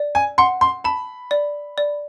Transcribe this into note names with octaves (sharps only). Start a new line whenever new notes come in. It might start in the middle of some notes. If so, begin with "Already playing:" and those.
Already playing: D5
G#5
F#5 C6
C6
A5 B5
D5
D5